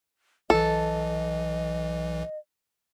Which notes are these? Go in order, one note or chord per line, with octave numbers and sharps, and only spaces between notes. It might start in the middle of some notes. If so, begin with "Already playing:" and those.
B1 E3 A4 D#5